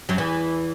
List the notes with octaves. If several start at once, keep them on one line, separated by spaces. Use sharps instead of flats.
F#2 F#3
E2 E3